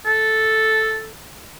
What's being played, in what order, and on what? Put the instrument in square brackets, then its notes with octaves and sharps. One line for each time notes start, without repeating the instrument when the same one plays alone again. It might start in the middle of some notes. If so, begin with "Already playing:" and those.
[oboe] A4